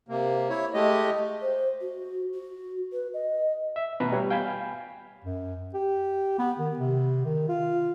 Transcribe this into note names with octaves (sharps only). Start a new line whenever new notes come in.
C3 A#3
E4 C#5
G#3 A3 G4 D#5
C5
F#4
F#4
B4
D#5
E5
B2 B4 E5 A#5
G3 C#5
F5 G5 G#5 B5
F#2
G4
B3
D#3
C3
D#3
F4